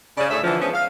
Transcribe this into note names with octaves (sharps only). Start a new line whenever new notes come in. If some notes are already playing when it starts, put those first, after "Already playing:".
C#3 D5
D2 A2 A3 G#4 E5
D3 E3 F3
F3 G#3 B3 C#4 D4 C5
F5